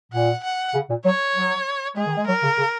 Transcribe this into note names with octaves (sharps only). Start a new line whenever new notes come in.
A#2 F#5
F#5
C#3
A#2
F#3 C#5
F#3
G#3 G#4
D#3
G#3
F#3 A#4
C#3
C#3